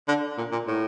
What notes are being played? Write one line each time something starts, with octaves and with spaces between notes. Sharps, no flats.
D3
A#2
A#2
A2